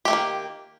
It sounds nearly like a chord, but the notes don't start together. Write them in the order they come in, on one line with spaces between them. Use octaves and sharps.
G4 A3 D#3 A#3